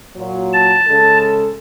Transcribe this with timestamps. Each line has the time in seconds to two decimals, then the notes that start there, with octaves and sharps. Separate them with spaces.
0.16 A#2 F#3
0.53 A5
0.87 C#3 G#3 A4